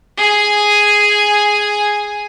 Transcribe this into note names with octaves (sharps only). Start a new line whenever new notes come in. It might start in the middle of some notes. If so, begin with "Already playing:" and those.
G#4 G#5